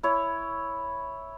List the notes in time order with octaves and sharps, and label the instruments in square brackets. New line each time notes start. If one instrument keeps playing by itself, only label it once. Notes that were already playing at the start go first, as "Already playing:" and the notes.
[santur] E4 C#5